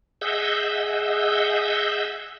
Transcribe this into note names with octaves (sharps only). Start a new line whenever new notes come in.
G#4 D#5 E5 F#5 E6 G6